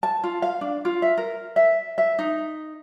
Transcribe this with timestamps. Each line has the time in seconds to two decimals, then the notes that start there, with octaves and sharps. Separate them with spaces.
0.03 A5
0.24 F4
0.42 F5
0.61 D4
0.85 F4
1.02 E5
1.18 A#4
1.56 E5
1.98 E5
2.19 D#4